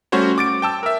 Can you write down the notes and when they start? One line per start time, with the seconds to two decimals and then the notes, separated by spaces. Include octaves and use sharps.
0.12 G3 A3 C#4 F#4 C5 C#5
0.38 D6 A6 D7
0.62 G5 A5 E6
0.83 A#4 E5